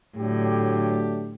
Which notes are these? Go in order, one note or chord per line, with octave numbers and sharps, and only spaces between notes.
A2 D3 F#3 A3 D4 G4